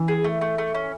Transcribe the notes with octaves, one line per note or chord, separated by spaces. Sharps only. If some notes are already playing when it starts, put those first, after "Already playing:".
Already playing: E3
G#4
A3
A3
A3
C#4